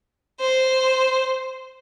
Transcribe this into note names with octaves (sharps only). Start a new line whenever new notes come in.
C5